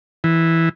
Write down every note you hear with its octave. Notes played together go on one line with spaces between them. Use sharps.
E3